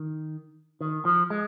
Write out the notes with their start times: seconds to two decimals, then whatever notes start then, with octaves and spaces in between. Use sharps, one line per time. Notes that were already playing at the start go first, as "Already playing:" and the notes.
Already playing: D#3
0.81 D#3
1.05 F3
1.30 G#3